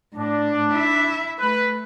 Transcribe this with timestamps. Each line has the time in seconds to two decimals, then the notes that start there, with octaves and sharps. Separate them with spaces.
0.14 A2 D4
0.72 E4 E5
1.39 A3 B4